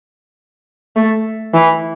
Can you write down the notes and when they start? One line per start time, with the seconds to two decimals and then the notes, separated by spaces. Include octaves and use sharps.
0.96 A3
1.54 E3